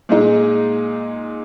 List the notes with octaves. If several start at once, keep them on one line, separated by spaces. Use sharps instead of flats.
A#2 G#3 D#4